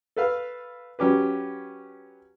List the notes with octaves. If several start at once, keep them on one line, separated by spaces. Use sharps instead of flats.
A4 B4 F5
F#3 C#4 G4 B4